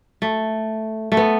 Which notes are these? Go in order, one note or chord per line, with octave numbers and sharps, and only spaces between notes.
A3
A3
B3